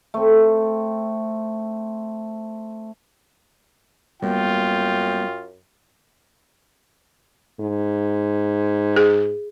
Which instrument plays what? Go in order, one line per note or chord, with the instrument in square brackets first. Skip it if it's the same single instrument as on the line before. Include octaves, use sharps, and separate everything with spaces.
[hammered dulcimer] A3 C4
[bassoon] F#2 [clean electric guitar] G3 A#3 B3 [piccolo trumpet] F4 [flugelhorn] G5
[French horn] G#2
[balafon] G#4